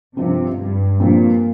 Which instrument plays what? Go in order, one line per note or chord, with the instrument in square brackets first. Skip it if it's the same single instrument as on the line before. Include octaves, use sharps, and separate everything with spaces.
[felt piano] G2 F3 C4 [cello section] C3
[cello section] G2
[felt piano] G2 F3 C4 [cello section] A#2